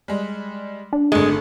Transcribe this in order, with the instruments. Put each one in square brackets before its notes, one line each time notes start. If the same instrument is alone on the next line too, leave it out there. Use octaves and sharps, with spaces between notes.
[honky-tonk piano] G3 G#3
[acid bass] D4
[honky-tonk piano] G#1 D3 A3 [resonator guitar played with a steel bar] G#3